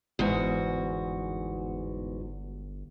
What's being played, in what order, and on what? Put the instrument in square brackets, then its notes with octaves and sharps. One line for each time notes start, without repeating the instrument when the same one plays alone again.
[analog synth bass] G1 [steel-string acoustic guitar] E2 G#2 F#4